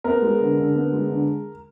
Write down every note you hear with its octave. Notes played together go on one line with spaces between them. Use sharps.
B3 A#4
G#3
D3
D3
B3
G#3
D3